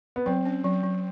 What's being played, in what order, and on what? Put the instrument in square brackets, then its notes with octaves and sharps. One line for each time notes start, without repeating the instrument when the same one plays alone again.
[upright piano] B3
[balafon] F#3 [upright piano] C4
[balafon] C#4
F#3
F#3